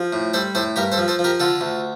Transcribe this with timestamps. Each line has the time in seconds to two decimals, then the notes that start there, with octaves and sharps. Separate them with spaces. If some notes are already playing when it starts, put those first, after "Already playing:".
Already playing: F3
0.13 A2
0.34 G3 A4 C5
0.55 A2 A4 C5
0.76 G2 G4 A#4
0.92 A4 C5
0.98 F3
1.08 A4 C5
1.19 F3
1.24 G4 A#4
1.40 D3 F4 A4
1.61 D2